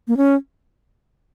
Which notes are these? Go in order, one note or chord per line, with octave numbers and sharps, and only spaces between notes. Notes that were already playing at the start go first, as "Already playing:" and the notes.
A#3
C#4